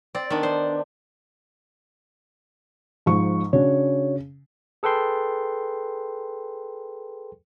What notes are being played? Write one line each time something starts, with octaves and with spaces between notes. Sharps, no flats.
C4 D5
D#3 B3 D4
C5
G#2 F3 C#6
C#3 D4 F#4 C#5
G#4 A4 B4 G5 C6